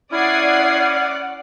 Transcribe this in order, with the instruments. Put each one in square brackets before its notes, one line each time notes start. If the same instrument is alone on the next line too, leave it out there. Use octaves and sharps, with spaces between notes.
[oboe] C#4 [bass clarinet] E4 [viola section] D5 F#5 [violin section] D#6 G#6 C7